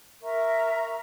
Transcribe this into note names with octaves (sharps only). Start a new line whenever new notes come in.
A#4 E5 A#5 C#6